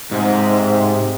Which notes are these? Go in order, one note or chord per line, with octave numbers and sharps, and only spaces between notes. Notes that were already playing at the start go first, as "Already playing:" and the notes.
G#2 C3